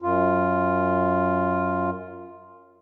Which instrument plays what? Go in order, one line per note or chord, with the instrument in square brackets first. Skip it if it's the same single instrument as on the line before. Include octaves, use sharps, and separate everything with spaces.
[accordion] F#2 F4